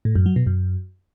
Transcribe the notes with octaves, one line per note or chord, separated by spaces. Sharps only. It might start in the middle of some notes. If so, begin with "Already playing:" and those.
A2
F#2
F#3
B2
F#2